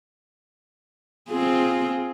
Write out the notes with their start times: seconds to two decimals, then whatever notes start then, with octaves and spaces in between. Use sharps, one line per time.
1.29 C4 F4 G#4